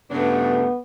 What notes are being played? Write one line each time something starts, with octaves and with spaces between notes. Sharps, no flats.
G2 C#3 A3 B3 D4